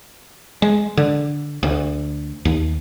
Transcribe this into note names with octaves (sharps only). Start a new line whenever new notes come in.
G#3
D3
D2
D#2